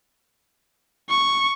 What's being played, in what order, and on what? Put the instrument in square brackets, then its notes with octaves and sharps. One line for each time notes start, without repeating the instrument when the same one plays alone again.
[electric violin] C#6